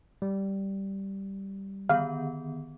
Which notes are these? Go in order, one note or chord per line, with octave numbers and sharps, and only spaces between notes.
G3
D3 D#3 B3 F5